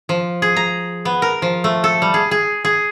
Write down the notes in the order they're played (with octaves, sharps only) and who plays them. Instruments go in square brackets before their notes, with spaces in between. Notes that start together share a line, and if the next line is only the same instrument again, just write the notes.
[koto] F3
G#4
A#5
B3
A#4
F3
A3
A4
G3
G#4
G#4
G#4